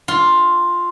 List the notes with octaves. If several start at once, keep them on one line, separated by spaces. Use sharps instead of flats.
F4